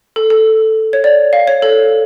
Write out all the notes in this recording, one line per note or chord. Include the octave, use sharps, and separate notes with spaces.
A4
A4
C#5
D5
F5
C#5
A4